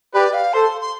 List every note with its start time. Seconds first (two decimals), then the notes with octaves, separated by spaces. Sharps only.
0.14 G4 B4 D5
0.33 F5
0.53 A4 C5 C6
0.81 C6